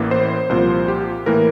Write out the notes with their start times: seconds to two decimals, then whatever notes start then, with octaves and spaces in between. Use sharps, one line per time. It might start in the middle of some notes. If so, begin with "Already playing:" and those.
Already playing: A1 A2 E3 A#3
0.11 C5
0.49 C2 A#2 F3 C5
0.88 G4
1.26 A2 E3 A#3 A#4